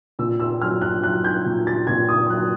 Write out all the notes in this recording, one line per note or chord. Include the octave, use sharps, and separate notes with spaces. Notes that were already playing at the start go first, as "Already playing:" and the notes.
A#2 E6
E6
F#3 F6
F#6
F#3 F#6
G6
A#2
A6
A#2 G#6
D#6
F#3 F#6